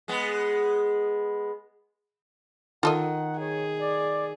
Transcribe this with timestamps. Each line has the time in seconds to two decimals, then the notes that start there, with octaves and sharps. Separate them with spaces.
0.08 G#3 B3
2.83 D#3 F4 A4 D#5 F#5
3.39 G#4 C#5
3.79 D5